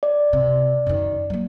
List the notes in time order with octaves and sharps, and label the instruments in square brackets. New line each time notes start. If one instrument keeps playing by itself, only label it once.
[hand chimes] D5
[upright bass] C3
F#2 D#3
F#3 A#3